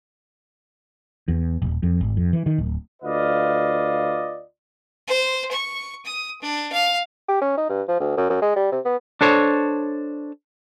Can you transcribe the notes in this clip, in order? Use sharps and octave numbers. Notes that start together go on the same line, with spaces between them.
E2
D#1
F2
G#1
F2
E3
D#3
D1
D2 F4 B4 D5 D#5 F5
C5
C#6
D#6
D4
F5
G4
C#4
D#4
G2
F3
D2
F#2
F#2
G#3
G3
C3
B3
D4 A4 C5 C#5